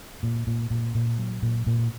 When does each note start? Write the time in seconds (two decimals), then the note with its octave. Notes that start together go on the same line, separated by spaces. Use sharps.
0.23 A#2
0.47 A#2
0.70 A#2
0.95 A#2
1.19 F#3
1.42 A#2
1.67 A#2